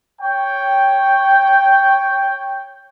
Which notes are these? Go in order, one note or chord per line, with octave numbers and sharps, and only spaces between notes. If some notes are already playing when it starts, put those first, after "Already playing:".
C#5 G5